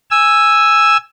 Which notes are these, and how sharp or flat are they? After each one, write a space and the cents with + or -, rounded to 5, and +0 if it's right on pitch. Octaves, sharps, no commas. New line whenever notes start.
G#5 -5 E6 +0